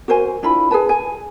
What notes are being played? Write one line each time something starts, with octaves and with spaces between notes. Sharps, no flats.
F#4 A#4 C5 G#5
D4 E4 F4 B5
G#4 A4 B4 A5
G#5